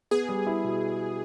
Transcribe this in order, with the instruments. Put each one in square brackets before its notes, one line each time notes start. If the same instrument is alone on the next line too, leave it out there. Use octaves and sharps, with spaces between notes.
[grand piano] B3 [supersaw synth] G#4
[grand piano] G3
E4
B2